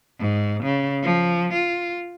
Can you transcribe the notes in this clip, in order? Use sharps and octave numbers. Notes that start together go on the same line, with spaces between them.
G#2
C#3
F3
F4